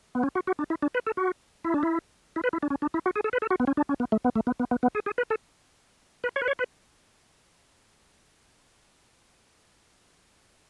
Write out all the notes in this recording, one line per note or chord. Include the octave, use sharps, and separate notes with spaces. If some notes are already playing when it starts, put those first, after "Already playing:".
B3
C#4
F#4
F#4
D4
E4
D4
B4
A4
F#4
E4
D4
E4
E4
B4
E4
D4
C#4
D4
E4
F#4
G#4
A4
B4
A4
F#4
B3
C#4
D4
C#4
B3
A3
B3
A3
B3
B3
B3
B3
G#4
G#4
B4
A4
B4
C#5
B4
C#5
B4